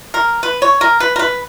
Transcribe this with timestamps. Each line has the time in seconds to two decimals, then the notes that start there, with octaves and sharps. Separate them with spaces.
0.14 A#4
0.43 B4
0.62 C#5
0.81 A#4
1.00 B4
1.16 A#4
1.19 B4